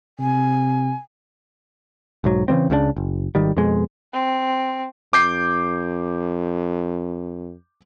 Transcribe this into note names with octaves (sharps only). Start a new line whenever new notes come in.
C3 G#5
B1 G#2 F#3
C#3 E3 G3 C4
C#2 C#3 E3 D4
F#1
G#1 D#3 G3
F2 B2 G#3
C4
F2 D6 G6 C7